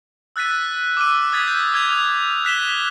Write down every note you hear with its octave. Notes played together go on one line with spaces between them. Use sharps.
E6 F#6 A6 B6 D#7
D6 E6 F6 D#7
D#6 G#6 A6 B6
G6
F6 G#6 F7
F#6 B6 E7 G7